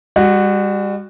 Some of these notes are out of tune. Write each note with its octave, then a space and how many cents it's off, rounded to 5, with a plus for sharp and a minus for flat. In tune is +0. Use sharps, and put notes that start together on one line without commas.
G3 +35 F#4 +0